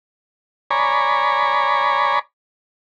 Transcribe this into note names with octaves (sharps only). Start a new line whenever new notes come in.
C#5 D5 G#5 A#5 B5